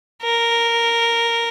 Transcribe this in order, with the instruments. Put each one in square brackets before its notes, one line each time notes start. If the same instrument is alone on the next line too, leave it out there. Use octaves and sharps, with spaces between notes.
[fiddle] A#4